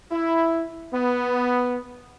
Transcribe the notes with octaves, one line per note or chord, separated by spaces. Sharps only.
E4
B3